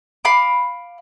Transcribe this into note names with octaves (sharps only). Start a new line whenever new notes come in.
F5 B5 D6